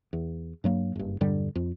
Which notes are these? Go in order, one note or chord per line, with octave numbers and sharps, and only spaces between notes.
E2
G2 F#3 A#3
F#1 G2
E1 G2 D3 G3
F2